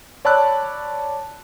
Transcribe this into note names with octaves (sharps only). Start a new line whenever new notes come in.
C#5 D5 A5 B5 E6 F#6